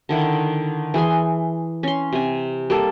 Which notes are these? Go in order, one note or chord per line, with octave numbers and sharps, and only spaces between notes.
D3 D#3 E4
E3 G#4 G#5 C6
C#4 C6
C3 G#5
G3 A#3 A4